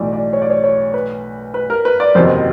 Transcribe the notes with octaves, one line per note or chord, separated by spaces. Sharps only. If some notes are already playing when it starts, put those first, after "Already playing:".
Already playing: B1 A2 E3 D5
D5
C#5
D5
C#5
C#5
B4
B4
A#4
B4
D5
F#1 E2 C3 D#3 F#3 C5